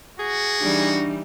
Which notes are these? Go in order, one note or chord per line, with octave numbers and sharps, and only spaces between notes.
F#4 G#4
E3 G3 D4 D#4